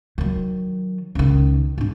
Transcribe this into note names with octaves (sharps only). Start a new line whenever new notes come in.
D#3 F#3
C#2 D#3
G#2 D4